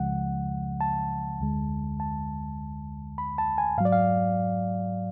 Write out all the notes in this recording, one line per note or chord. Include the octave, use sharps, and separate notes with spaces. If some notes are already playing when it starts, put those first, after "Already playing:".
Already playing: C#2 C#3 F3 G#3 F#5
A5
D2 D3 G#3
A5
B5
A5
G#5
G#2 F#3 D5 F5
F5